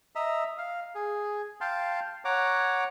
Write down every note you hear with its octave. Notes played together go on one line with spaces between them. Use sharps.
D#5 E5 A#5
F5
G#4
F5 G5 A5 C6
C#5 F#5 A#5 D6